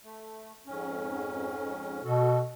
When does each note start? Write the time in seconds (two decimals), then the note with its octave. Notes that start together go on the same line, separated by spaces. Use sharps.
0.04 A3
0.67 F2 G#2 C#4
2.04 B2 F#4 A4